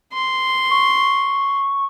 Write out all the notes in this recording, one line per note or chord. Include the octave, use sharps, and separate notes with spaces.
C6
C#6